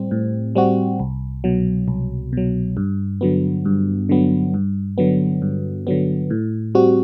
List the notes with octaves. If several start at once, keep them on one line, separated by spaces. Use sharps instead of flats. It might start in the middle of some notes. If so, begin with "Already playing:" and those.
Already playing: A2 G3 C4
A2
G3 C4 F#4
C2
B2 F#3
C2
B2 F#3
G2
D3 F#3 B3
G2
D3 F#3 B3
G2
D3 F#3 B3
G2
D3 F#3 B3
A2
G3 C4 F#4